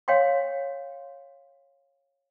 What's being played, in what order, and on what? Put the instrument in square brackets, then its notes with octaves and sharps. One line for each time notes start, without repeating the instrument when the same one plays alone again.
[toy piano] C#5 F5 G5 C6